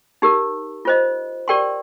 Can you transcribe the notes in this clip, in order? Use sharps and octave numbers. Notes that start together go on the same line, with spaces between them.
D#4 G4 A#4
F4 C5 D#5
G4 A#4 D5 G5 C6